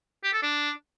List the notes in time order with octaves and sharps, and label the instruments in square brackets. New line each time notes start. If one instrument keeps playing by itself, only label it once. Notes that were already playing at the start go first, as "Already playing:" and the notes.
[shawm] G4
A4
D4